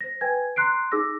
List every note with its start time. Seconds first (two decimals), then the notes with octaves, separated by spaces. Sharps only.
0.01 C5 A#6
0.21 B4 G5 G#5 G#6
0.56 A#5 C6 F#6 C7 D7
0.92 D#4 G#4 D6 E6 A#6